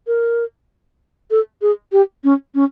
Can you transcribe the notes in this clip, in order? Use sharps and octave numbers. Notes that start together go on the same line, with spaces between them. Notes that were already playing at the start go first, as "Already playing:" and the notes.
A#4
A4
G#4
G4
C#4
C#4